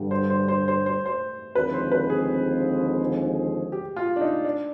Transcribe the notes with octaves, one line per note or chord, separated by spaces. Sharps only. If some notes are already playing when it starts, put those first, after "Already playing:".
Already playing: G2 D3 G3
C5
C5
C5
C5
C5
C5
D#2 D3 F3 G#3 C4 B4
C5
B4
G#4
G4
F4
D4
D#4
D4